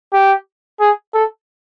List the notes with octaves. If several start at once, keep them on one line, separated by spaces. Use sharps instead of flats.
G4
G#4
A4